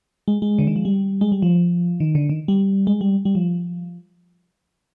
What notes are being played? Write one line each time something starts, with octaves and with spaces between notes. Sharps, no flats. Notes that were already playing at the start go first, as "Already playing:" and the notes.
G#3
G#3
D3
D#3
F3
G3
G#3
G3
F3
D#3
D3
D#3
G3
G#3
G3
G3
F3